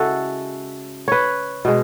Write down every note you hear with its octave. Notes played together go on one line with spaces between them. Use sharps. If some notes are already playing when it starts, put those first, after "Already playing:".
Already playing: C#3 G#3 E4 F#4 A4
B4 C#5
B2 G#3